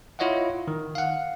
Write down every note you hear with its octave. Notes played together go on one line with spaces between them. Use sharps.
E4 F4 C#5 D#5 F5 F#5
D#3
F5 F#5